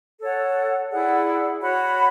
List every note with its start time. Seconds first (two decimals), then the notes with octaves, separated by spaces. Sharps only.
0.20 A4 C#5 F#5
0.90 E4 G#4 D5 F#5
1.60 F#4 C#5 F#5 B5